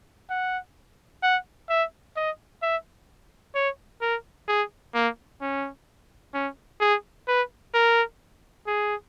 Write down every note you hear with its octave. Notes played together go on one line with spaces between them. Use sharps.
F#5
F#5
E5
D#5
E5
C#5
A#4
G#4
A#3
C#4
C#4
G#4
B4
A#4
G#4